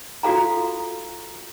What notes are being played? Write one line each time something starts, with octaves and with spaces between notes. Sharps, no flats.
F4 F#4 A4 F5 A#5